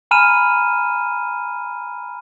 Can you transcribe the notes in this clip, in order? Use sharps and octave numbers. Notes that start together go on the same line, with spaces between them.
G#5 A#5 B5 F6 D#7 E7